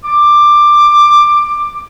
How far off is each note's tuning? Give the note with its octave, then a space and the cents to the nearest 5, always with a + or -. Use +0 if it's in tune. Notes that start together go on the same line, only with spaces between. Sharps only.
D6 +15